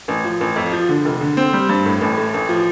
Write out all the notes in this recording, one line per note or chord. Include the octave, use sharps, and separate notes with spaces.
A1
F3
A1
F2
F3
D3
F1
D3
C4
G3
G2
A2
A1
A3
A1
F3